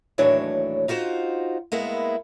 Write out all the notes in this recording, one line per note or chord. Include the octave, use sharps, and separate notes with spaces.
D#2 A2 E3 F#3 D4 C#5
D#4 F4 F#4 C5
G#3 A#3 B3 E4